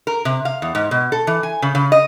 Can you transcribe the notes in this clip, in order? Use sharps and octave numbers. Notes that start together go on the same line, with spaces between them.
A#4
C3
F5
E2
G#2
B2
A4
E3
G#5
C#3
C#3
D#5